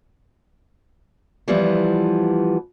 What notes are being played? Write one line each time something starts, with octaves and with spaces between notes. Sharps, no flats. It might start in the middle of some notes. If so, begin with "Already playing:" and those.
E3 F3 G3 B3